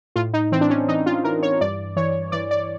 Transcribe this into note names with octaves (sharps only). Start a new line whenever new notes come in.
A2 F4
D#4
E3 C4
D4
C#4
E3 D#4
F4
E3 A#4
C#5
G2 D5
E3 C#5
E3 D5
D5